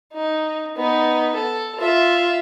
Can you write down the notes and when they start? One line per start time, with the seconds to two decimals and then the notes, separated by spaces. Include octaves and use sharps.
0.12 D#4
0.77 B3 D#4
1.35 A4
1.78 F4 E5